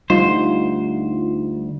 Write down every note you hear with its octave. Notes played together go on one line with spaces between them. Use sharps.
D2 A#2 G3 D#4 F4 C5